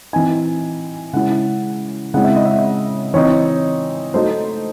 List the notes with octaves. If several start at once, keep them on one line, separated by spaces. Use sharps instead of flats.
E3 C4 D#4 G#5
C#3 G#3 C#4 E4 F#5
C#3 G#3 C4 E4 F#5
E5
D#5
E5
E3 C4 D#4 C#5
F#3 A3 D#4 C5